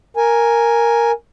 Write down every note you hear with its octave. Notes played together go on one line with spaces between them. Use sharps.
A#4 G#5